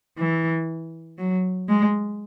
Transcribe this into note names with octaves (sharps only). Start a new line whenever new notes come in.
E3
F#3
G#3